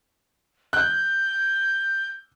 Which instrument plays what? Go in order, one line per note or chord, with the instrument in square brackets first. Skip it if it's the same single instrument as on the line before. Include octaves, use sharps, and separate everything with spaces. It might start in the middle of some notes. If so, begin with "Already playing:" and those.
[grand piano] F#6 [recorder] G6